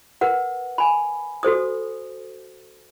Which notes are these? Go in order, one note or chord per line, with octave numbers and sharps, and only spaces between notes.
A#4 B4 F#5
G#5 B5
F#4 A4 C5 D#6